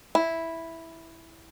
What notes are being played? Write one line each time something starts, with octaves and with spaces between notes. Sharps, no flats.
E4